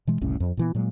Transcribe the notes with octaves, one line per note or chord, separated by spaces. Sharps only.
B2 E3 G#3
F#1 C2 A2 C#4
F2
A#2 E3 B3
A#2 F#3 G#3